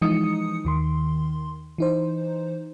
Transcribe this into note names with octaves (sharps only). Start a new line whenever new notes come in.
E3 F3 G#3 D#4 D#6 C#7
D#2 D#3 C6
E3 D#4 C5